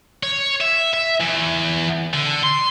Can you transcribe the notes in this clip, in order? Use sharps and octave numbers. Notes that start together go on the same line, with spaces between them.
C#5
E5
E5
E2
D3
C6